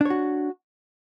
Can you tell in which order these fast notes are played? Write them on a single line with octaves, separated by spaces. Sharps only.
D4 C#5 F#4